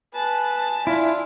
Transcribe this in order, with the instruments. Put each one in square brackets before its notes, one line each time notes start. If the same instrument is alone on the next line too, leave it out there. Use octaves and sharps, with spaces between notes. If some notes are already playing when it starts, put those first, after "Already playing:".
[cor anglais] B4 [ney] G#5 [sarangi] A5
[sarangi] A5
[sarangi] D4 [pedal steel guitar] E4 [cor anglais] F4